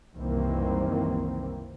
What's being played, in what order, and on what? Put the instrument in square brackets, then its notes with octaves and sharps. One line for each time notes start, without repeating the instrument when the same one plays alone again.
[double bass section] F#1 C2 D#3 E3 A#3 C4